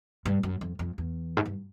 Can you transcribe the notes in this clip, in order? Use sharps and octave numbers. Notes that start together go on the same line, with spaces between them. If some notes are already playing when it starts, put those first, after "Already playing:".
G2
F#2
F2
F2
E2
G#2
G2